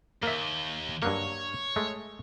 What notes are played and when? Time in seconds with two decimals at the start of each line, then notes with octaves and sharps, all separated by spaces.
0.23 D#2 A#3 E5
1.02 G2 F#3 A#3 C#5
1.76 G#3 A3